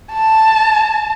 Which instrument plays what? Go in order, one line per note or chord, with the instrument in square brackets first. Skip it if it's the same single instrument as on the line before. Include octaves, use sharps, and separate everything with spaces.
[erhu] A5